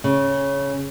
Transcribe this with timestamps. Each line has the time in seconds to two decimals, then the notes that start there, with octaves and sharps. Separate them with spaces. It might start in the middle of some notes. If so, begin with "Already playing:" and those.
0.04 C#3